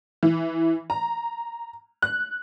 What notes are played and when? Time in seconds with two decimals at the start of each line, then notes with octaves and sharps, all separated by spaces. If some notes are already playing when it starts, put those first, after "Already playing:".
0.23 E3
0.90 A#5
2.02 F#6